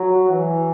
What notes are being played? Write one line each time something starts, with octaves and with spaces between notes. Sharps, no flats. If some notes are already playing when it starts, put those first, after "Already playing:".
Already playing: F#3
E3